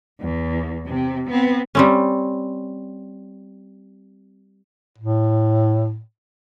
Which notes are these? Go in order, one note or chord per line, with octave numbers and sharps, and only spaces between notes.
E2
C3
B3 C4
G3 C4 C#4
A2